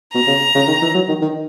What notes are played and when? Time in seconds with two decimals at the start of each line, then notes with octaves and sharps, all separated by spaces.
0.14 B2 A#5
0.27 C#3
0.55 C#3
0.67 D#3
0.82 E3
0.94 F#3
1.08 D#3
1.21 D#3